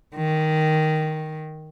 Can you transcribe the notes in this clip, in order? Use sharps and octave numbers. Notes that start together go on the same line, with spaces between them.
D#3